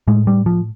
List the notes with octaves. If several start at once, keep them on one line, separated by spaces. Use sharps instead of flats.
A2 G#3
G3
F3